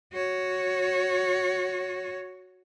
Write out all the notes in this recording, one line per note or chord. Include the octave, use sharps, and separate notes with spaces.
F#4 C#5